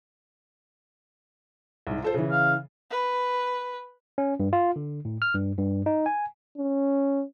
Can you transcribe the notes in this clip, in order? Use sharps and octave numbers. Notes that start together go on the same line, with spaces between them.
C2 G#2
F4 A4 C5
C#3 E3
F5
B4
C#4
G2
F4
D3
A2
F6
G2
G2
D#4
G#5
C#4